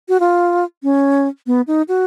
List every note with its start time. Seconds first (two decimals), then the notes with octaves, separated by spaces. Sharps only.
0.09 F#4
0.20 F4
0.83 C#4
1.47 B3
1.67 D#4
1.88 F#4